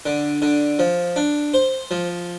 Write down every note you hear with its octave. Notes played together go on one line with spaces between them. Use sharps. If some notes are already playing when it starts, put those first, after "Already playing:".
D3
D3
F3
D4
C5
F3